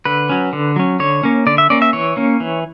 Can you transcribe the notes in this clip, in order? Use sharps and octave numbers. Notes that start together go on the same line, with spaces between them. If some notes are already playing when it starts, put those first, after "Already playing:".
D3 B4
F#3 C#4
D3
F#3 C#4
D3 C#5
A#3 C#4
D3 D5
E5
A#3 C#4 D5
E5
E3 C#5
A#3 C#4
E3